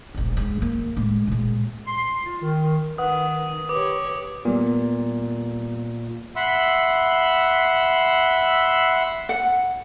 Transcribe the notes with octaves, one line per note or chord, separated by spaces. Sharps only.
E1 A#1
G#2
D#3 A#3
A2 G#3
A#2 G#3
C6
F4
D#3
D#3 B4 F#5 D#6
G4 B4 C#5 D6
A#2 G3 B3
E5 F#5 B5 C6 E6
F#5